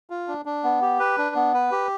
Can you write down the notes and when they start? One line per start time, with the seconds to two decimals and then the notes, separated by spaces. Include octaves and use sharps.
0.10 F4
0.28 D4
0.45 D4
0.64 B3
0.82 G4
1.00 B4
1.18 D4
1.36 B3
1.54 B4
1.72 G4